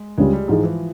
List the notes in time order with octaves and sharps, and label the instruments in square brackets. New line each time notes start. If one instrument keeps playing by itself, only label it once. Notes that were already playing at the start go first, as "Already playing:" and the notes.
Already playing: [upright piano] G#3
[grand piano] C#2 C#3 G3 [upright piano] G#3
[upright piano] G3
[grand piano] G#2 E3 G#3 [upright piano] F3
[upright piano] E3